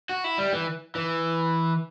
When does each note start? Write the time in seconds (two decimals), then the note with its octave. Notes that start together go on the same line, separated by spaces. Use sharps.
0.09 F#4
0.24 E4
0.38 G3
0.52 E3
0.95 E3